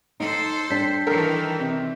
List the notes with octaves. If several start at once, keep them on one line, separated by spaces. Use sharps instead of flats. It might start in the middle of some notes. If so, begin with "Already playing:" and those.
D#4 A4 C5
G3 D4 G6 B6
D#3 E3 A4 A#4
C3